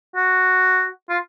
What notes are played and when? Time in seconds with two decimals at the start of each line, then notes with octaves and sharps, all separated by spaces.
0.16 F#4
1.10 F4